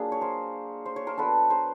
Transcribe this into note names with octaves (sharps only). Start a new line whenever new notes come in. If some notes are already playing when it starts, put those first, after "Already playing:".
Already playing: F#3 A#3 D4 F4 G#4
C#5
A#4 C5
C5
C#5
A#4 C5
F#3 B3 D4 A4 B4
A#4 C5